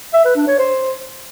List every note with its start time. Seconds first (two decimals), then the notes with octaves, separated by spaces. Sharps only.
0.14 E5
0.25 B4
0.36 D4
0.47 C#5
0.59 C5